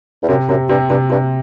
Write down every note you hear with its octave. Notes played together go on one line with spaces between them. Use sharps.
E2
F#2 C3
F#2 C3
G2 C3
G2 C3
G2 C3